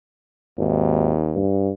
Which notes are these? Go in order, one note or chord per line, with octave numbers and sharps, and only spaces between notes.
G#1 D#2
G2